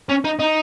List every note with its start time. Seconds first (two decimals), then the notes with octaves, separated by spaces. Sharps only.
0.09 C#4
0.25 D#4
0.39 D#4